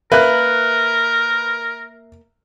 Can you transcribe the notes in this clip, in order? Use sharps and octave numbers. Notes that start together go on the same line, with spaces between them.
A#3 A#4 B4 E5 F#6